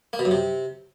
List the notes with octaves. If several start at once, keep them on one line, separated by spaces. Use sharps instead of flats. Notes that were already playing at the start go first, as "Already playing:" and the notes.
A#3
B2
F#2
C3